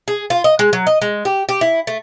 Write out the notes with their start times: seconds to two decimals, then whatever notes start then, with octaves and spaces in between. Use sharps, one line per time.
0.08 G#4
0.30 F4
0.44 D#5
0.59 G#3
0.73 F#3
0.87 D#5
1.02 G#3
1.25 G4
1.49 G4
1.61 E4
1.87 A3